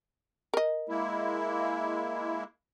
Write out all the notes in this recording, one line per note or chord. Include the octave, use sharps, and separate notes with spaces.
A#4 D#5
G#3 A#3 E4